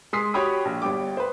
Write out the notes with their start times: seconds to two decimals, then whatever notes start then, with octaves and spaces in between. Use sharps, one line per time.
0.13 G#3 C6 D#6 B6 C7
0.34 F#4 G4 C#5 G5 B5 D#6
0.65 A#1
0.82 G1 G3 G5 D6
1.17 B4 C5